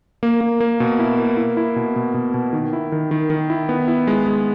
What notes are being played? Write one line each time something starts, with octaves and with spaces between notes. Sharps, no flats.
A#3
A#3
A#3
B2
E4
A#3
E4
E4
B2
B2
B2
B2
D#3
E4
D#3
D#3
D#3
E4
B3
E4
G#3
G#3